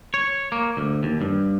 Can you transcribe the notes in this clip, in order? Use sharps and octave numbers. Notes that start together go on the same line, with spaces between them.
C#5
A#3
D2
D#2
G2